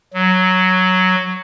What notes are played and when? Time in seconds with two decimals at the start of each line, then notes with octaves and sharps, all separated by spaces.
0.14 F#3